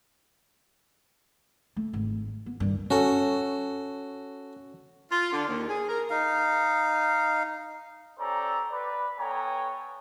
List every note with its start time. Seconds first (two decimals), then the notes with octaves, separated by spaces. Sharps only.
1.76 A3
1.93 G#1
2.46 B3
2.60 G2 D#3
2.91 C#4 F#4 A4
5.12 F4
5.32 D3
5.48 D#2
5.68 G#4
5.89 A#4
6.10 D#4 F5
8.19 C#4 G4 A4 C5 D5 A#5
8.70 B4 D5
9.18 B3 A4 C#5 G5 G#5 A#5